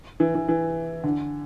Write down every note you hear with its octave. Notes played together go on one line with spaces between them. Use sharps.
E3
E3
E3
D3